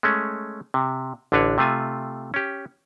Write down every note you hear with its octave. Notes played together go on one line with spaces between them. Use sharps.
G#3 A3 C#4
C3
A1 D3 D4 B4 C#5
C3 A3 F4 G#5
C#4 G4